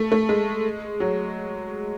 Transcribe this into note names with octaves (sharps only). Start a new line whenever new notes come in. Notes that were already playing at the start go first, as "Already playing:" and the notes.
Already playing: A3
A3
G#3
F#3